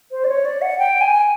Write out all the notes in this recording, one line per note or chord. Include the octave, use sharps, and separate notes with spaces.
C5
D5
C#5
D5
F#5
G5
G#5